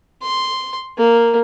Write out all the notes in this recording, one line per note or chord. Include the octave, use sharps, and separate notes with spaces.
C6
A#3